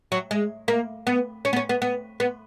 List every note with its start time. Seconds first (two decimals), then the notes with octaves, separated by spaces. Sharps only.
0.12 F#3
0.31 G#3
0.68 A#3
1.07 B3
1.45 C#4
1.53 B3
1.56 C#4
1.69 B3
1.82 B3
2.20 B3